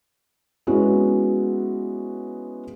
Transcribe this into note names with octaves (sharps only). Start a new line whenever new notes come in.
G#3 B3 C#4 E4 F#4